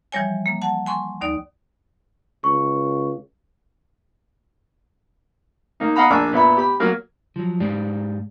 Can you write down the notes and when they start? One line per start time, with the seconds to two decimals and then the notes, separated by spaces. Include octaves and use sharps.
0.12 E3 F3 G3 C#5 G#5
0.46 A#3
0.62 F#5 A5
0.86 G#5 C6 C#6
1.21 D#2 D#4 D5
2.44 C#2 C#6
5.80 A#3 D#4
5.96 D#5 F5 F#5 A#5 B5
6.10 A#1 A#3 D4 G#5 D6 E6
6.33 A#2 B3 E5 B5
6.57 G4 B5
6.80 F#3 A#3 A#4
7.36 F3 F#3
7.60 G#2 G#3 G4 D5